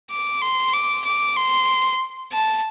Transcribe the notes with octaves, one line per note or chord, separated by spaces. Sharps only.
D6
C6
D6
D6
C6
A5